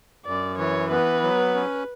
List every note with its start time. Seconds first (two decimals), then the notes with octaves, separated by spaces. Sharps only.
0.26 F#2 D5
0.58 E3 C#5
0.91 B3 B4
1.23 F#3
1.55 C#4